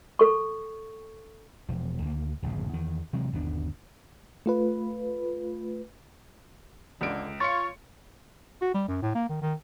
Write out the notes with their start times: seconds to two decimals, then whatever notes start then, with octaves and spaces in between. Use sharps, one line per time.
0.19 A4 C#6
1.69 E1 F3
2.02 D2 A#3
2.42 D1 A#1 F#2 C#3
2.73 E2 D#3
3.13 C3 E3 F#3 G#3
3.32 G1 D#2 B3 D4
4.46 A3 F4 B4
7.01 C#2 D3 D7
7.40 F4 C#5 C6 C#6 A6 C#7
8.62 F#4
8.75 G3
8.88 F#2
9.02 A2
9.15 A#3
9.29 D#3
9.41 D#3